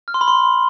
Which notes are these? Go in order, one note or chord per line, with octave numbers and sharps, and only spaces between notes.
F6
C6
B5
C6